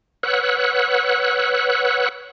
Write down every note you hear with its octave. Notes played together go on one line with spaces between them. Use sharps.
B4 C#5 F#5 E6 F#6